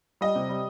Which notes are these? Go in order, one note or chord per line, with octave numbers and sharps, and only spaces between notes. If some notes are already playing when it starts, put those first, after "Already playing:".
G3 D#5
C3
G3